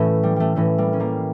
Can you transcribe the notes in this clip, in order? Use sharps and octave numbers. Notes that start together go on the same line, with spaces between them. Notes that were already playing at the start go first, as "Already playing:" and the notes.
Already playing: A2 E3 A3 C#4
G3
G3 A3
A2 E3 A3 C#4
G3 A#3
C#4
G3 A#3